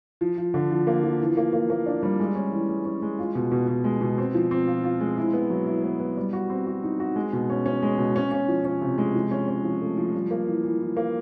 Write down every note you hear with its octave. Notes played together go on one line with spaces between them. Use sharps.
F3
F3
D3
F3
A#3
F3
E3
A#3
A#3
A#3
D4
G3
G#3
C#4
E3
G#3
C#4
G#3
F4
B2
B2
B2
G#3
B2
C4
F3
C4
F4
F4
G#3
E4
B3
F#3
E4
B3
B3
G3
F#4
C4
F#4
D#4
F#4
G#3
B2
C#4
C#4
G#3
B2
C#4
C#4
F3
C#4
C3
G#3
F3
C#4
C#4
F3
A3
F3
G3
A#3
E3
E3
E3
A#3